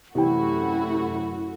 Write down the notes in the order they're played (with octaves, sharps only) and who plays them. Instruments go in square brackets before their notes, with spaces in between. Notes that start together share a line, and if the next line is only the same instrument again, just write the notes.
[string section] F#2 A3 F#4 [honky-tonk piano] C3 E3 G5 [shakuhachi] E4